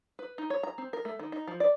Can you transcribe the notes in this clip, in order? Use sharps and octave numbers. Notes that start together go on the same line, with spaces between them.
B4
D#4
C#5
A#5
C4
A#4
A3
D#3
D#4
F3
D5